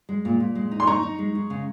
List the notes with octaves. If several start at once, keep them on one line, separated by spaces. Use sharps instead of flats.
G#3
A#2
A#2
G#3
D#4
C6
D#4 A#5 C#6
D#4
G#3
G#3
C#3